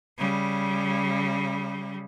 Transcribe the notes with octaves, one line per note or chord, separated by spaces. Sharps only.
C#3 G3